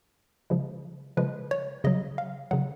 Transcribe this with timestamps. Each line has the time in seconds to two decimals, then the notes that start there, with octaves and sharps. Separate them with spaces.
0.50 C#3 F3 G#3
1.17 C#3 F3 G#3 B4
1.51 C#5
1.84 C#3 F#3 D#5
2.18 F5
2.51 C#3 F#3 F#5